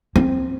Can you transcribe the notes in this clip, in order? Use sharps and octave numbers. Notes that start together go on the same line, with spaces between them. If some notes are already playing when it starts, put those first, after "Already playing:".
C4